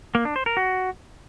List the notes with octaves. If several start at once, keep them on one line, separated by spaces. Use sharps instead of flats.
A#3
D4
C5
A#4
F#4